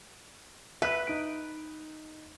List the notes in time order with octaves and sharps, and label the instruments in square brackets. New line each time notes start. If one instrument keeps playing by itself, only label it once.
[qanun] B4 [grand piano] E5 F#6
[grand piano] D#4 D7